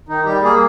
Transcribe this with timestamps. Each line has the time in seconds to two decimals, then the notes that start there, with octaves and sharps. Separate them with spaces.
0.08 D#3 D#4
0.25 G3 G4
0.42 A#3 G#4